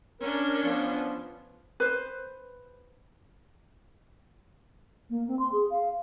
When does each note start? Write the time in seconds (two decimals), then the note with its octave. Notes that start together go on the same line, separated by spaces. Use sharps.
0.20 C#4 D4 A#4
0.63 F3 B3
1.80 B4 C5
5.10 A#3
5.28 C4
5.39 C6
5.52 G#4
5.70 F5